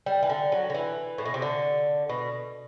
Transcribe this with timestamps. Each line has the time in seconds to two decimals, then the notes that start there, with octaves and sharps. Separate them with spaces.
0.06 G3
0.23 E3
0.29 D3
0.52 F#3
0.70 D3
0.74 E3
1.18 A2
1.25 B2
1.34 C3
1.42 D3
2.09 B2